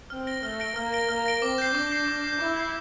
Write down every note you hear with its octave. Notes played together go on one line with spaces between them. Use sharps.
C4 F6
A#6 D7 G7
A3 F6
A#6 D7 G7
A#3 F6
A#6 D7 G7
A#3 F6
A#6 D7 G7
C4 D6
G6 C7
D4 D6
G6 C7
D6
G6 C7
E4 D6
G6 C7